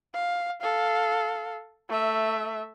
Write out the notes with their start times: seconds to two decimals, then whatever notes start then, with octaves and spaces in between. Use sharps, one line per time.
0.14 F5
0.62 A4 F5
1.89 A3 E5